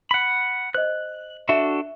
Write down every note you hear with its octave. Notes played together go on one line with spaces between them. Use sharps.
F#5 B5
C5 D#5 F#6
D4 F#4 A4 E5